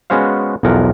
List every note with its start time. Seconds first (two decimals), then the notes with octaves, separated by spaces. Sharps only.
0.10 G#3 B3 C#4 F#4 C5 F5
0.63 B1 E2 F3 A#4 F#5